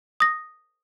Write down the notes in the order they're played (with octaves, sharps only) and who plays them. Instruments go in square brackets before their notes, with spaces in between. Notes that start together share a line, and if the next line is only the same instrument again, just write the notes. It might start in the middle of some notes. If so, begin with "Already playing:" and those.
[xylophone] D#6 A#6